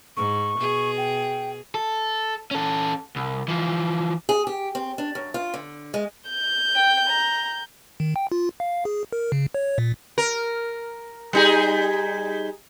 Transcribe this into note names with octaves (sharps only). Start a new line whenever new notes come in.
G#2 C#6
B2 G#4
G5
A4
C#4 A4
C2
E3 F3
G#4
G4
C4
D4
F#2
F4
D3
G#3
G6
G5
A#5
D#3
G5
F4
F5
G#4
A#4
C#3
C#5
A#2
A#4
G3 D#4 G#4